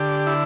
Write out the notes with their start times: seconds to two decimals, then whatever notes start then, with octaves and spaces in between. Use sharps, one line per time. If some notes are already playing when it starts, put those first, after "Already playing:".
Already playing: D3 G4
0.27 E4